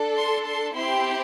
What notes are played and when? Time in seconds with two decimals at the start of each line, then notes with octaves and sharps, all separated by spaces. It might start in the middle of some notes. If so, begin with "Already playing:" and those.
Already playing: D4 A4
0.16 C6
0.45 C6
0.75 C4 E4 G4 C6